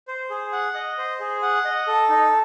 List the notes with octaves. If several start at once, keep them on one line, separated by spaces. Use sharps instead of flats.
C5
G#4
F#5
D#5
C5
G#4
F#5
D#5
A4
D#4